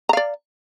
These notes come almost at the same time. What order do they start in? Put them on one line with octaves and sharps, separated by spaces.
A#5 F5 D5